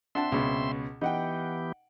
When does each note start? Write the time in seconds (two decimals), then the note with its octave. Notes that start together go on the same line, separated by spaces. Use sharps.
0.15 C4 D4 E5 F#5 A5 C6
0.32 C#2 B2
1.02 E3 B3 D#4 G4 F#5 G5